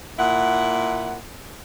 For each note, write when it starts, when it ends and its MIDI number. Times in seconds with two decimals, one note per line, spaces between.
0.18 1.16 46
0.18 1.16 64
0.18 1.16 78